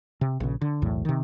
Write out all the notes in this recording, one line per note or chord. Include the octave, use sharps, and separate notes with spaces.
C3
A#1 C#3
D3
B1 E2 A2
C3 D#3